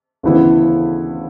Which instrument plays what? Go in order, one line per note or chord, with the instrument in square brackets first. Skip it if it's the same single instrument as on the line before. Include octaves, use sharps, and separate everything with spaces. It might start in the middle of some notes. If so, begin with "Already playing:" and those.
[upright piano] D2 C#3 E3 B3 E4